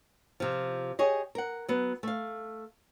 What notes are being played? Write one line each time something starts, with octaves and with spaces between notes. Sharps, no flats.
C3 F3
G4 G#4 C#5 D#5
A#4 F#5
F#3 B3
A3 F5